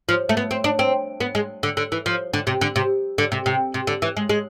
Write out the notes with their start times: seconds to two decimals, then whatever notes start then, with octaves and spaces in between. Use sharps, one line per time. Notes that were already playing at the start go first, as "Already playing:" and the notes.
0.09 F3
0.29 A3
0.37 B3
0.51 C4
0.64 D4
0.79 C4
1.20 B3
1.35 G#3
1.63 D3
1.77 D3
1.92 E3
2.06 F3
2.34 D3
2.47 C3
2.61 D3
2.76 C3
3.18 D3
3.32 C3
3.46 C3
3.74 C3
3.87 D3
4.02 E3
4.17 G#3
4.29 G#3